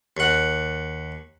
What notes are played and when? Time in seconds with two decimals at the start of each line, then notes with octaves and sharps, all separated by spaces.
0.17 D#2 F#5